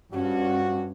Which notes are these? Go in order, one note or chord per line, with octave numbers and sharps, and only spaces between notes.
G2 F3 C#4 D4 F#4